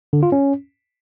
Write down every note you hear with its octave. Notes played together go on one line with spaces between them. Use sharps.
D3
F4
C#4